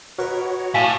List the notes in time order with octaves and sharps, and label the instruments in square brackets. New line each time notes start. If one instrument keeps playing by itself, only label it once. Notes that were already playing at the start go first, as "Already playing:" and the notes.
[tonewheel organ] F#4 C#5 [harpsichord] A#4 B4 D#5
[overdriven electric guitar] A2 [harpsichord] G4 [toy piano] F5 G#5 A5